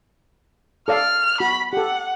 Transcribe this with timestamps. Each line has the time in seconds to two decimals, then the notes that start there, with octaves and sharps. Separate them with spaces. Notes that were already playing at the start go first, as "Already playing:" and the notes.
0.88 A4 D5 F5 F6
1.40 F#4 B5
1.73 G4 A4 F#5